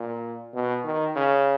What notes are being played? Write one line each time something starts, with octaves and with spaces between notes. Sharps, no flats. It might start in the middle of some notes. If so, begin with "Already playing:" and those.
Already playing: A#2
B2
D#3
C#3